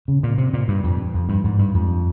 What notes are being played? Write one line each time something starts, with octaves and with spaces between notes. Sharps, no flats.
C#3
A#2
C3
A#2
G2
F2
F2
G2
G#2
G2
F2